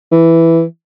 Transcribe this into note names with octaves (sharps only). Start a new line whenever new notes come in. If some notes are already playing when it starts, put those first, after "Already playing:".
E3